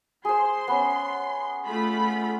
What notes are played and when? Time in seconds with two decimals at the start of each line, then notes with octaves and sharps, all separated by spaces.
0.25 G#4 C5 C6
0.68 B3 C#4
1.66 A3 F4 B5